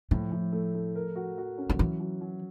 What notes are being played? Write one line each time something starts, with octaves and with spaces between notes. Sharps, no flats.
A2 F3
A2
A3
A3
A#4
F#4
F#4
C#4
F3
E3 F#3
F#3
F#3